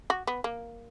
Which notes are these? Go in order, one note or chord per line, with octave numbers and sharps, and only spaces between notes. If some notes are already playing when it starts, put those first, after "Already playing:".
F#4
B3
A#3